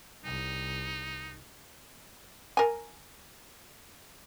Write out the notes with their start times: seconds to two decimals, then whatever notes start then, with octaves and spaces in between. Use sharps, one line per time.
0.24 C2 D#4
2.57 A#4 G#5